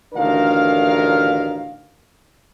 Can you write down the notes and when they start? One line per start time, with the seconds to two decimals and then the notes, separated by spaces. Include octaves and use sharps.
0.15 A1 D2 D#3 D4 A#4 F5